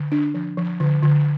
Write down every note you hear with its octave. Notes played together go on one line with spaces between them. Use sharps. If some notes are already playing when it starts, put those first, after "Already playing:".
Already playing: D3
D4
F3
F3
D3
D3